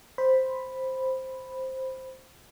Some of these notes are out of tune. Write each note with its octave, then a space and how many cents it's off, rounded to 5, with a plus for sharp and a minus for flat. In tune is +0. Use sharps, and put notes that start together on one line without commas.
C5 +0 B5 +0